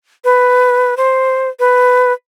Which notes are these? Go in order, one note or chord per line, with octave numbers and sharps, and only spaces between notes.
B4
C5
B4